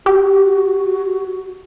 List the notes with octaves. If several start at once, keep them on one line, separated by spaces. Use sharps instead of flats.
F#4 G4